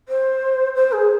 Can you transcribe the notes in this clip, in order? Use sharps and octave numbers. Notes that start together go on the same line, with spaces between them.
C5
C5
G#4